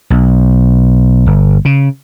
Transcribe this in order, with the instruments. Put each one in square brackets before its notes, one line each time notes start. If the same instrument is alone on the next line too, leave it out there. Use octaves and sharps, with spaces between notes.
[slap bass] B1
G1
C#3